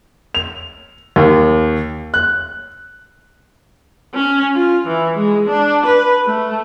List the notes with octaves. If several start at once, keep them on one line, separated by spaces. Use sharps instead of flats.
F7
D#2
F#6
C#4
F4
E3
G#3
D4
B4
A3